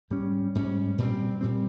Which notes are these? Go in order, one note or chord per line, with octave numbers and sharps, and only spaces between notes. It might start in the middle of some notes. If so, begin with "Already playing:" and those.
G#2 G3 C#4
G#2 G3 C#4
A#2 G3 C4
A#2 G3 C4